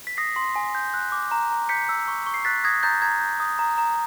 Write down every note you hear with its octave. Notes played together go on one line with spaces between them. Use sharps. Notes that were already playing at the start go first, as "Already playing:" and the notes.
B6
D#6 A#6 C7
C6
G#5
G6
F#6
D6
A#5
A#5
G6 B6 C#7
E6
C#6
C#6
C7
F#6 A6 B6
D#6 G#6 A#6
A#5 G6 A6
A#5 G#6
G6
D#6
A#5
A#5